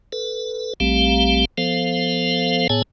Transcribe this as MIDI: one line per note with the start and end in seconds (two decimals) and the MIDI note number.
0.13 0.74 69
0.13 0.74 71
0.80 1.45 34
0.80 1.45 55
0.80 1.45 57
0.80 1.45 60
0.80 1.45 67
0.80 1.45 77
1.58 2.67 53
1.58 2.67 59
1.58 2.67 69
1.58 2.67 72
1.58 2.67 77
2.70 2.82 45
2.70 2.82 59
2.70 2.82 68
2.70 2.82 73
2.70 2.82 80
2.70 2.82 81